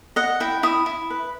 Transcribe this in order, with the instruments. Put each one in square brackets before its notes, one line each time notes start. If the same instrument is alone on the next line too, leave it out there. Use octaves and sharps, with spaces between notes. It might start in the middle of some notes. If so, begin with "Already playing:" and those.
[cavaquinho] D#5 F#5
E4 G5
E4 D#6
E4
B4